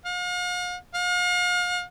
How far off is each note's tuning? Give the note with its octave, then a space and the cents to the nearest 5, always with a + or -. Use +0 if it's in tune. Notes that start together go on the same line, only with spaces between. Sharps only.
F5 +45
F5 +40